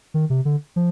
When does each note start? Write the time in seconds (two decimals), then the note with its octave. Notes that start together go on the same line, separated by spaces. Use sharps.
0.14 D#3
0.30 C3
0.45 D3
0.76 F3